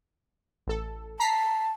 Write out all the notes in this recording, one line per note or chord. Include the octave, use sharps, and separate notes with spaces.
A1 A4
A5 A#5 B6 C7